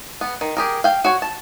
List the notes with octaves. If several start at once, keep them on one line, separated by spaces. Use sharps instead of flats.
B3
D#3
G4 G#4 A#4
F5 G5
F#4 C#5
A5